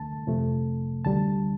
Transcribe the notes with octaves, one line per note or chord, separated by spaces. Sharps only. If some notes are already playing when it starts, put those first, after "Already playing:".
Already playing: D2 D3 A3 A5
F2 C3 F3 A3
D2 D3 G3 A5